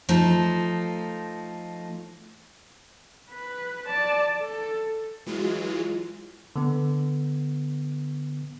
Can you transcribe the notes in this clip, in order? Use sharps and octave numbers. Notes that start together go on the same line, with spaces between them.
F3 A3 D#4
B4
D5 A5
A4
E3 F#3 G#3 F4
D3 B3